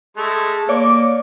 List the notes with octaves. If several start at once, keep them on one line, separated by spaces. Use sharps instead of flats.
G#3 A3
A#3 C#5 D5 D6